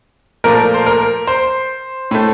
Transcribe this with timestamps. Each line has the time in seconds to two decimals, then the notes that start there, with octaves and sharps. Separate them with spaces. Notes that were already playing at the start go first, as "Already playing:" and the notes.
0.44 A#2 F3 A3 A#4
0.74 C5
0.86 A#4
1.27 C5
2.11 A2 A3